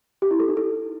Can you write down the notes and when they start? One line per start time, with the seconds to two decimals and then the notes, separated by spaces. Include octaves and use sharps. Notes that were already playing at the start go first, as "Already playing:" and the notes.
0.22 G4
0.31 E4
0.40 A4
0.48 D#4
0.57 A4